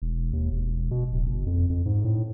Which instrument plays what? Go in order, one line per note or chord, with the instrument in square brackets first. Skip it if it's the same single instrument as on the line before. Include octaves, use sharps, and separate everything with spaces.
[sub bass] E1
D#2
E1
B2
D1
F#1
F2
F2
G#2
A2